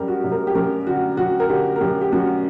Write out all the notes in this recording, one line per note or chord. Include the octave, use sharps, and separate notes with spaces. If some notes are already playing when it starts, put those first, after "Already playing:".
Already playing: F#2 G3 G4 A#4
F#4
F#2
A#4
G4
F#2 A#4
D3 F#4
F#2 F#4
A#4
D3 G4
A#4
F#2 G4
G4
F#2 F#4